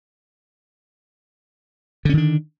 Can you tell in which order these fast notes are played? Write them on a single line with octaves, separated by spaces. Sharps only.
D3 C#4 D#3 D4